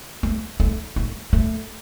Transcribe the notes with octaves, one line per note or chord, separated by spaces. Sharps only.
A3
A3
A3
A3